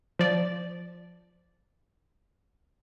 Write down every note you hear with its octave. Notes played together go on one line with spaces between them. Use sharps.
F3 D5